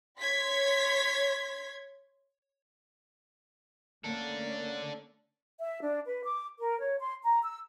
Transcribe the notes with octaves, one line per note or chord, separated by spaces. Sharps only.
C#5 C6 G#6 B6
A3 A#3 C#4 D4 A4
E5
D4
B4
D6
A#4
C#5
C6
A#5
E6